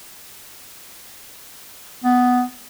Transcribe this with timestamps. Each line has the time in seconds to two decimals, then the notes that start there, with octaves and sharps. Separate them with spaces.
2.04 B3